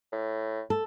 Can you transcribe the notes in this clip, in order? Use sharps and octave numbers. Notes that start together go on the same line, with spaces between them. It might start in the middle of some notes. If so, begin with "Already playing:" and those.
A2
A4